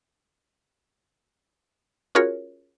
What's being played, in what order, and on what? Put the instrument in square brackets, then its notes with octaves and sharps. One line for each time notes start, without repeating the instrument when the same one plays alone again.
[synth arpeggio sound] C#4 F4 F#4 G#4 A#4 C#5